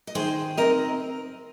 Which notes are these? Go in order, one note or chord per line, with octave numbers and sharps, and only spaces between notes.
D#5
D#3 G#4 C5
C4 A#4 D#5